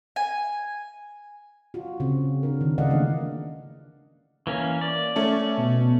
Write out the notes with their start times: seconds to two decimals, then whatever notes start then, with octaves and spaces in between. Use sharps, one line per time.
0.16 G#5
1.74 F4 F#4
2.00 C#3 C4
2.43 D4 A#4
2.61 D#3
2.78 C#3 G#3 D5 D#5 F5 F#5
2.90 D#3 E3 A3 A#3 D4
4.47 E3 A#3 C#4
4.81 D5
5.16 A3 C#4 A4
5.58 B2